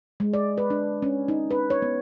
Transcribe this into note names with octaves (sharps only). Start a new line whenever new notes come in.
G#3
D5
B4
D4
C#4
D#4
B4
C#5
B3